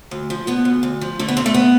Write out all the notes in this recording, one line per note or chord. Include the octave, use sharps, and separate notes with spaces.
D2
F3
D3 B3
D2
D2
F3
D3 A3
B3
D2 C4
A3
B3